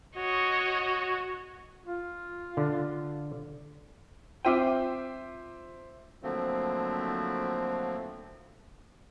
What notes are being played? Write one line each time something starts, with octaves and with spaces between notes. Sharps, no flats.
F#4 C#5 D#5
F4
D3
C4 F4 C5 E5 G5 D6 D#7
D3 F3 F#3 A3 A#3 C4